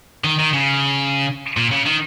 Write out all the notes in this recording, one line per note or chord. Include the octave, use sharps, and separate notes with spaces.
D#3
D#3
C#3
A#2
C#3
D#3